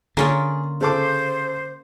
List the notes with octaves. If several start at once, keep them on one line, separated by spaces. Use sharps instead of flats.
D3 A#3 C#4 F4 G#4
C#3 A4 C5 D6